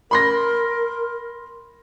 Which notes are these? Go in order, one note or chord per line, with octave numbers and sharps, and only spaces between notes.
A#4 B5 C6 A#6